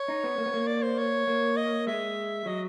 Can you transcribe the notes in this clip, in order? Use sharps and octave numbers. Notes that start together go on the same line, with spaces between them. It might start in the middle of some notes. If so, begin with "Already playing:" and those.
Already playing: C#5
D#4
B3
A#3
B3
A#3
D5
C5
C#5
A#3
D#5
G#3 E5
F#3 D#5